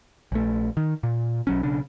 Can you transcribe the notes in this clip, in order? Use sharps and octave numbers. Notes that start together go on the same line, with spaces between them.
A#1 A3
D#3
A#2
B1 F#3 C#4
B1 C#3 D4